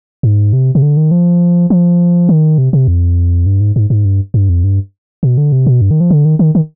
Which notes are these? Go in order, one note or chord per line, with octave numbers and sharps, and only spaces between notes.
G#2
C3
C3
D3
D#3
F3
F3
D#3
C3
C3
F2
G2
G#2
G#2
G#2
G2
G2
F2
G2
B2
D3
C3
B2
G2
D#3
F3
D3
D#3
D#3
D#3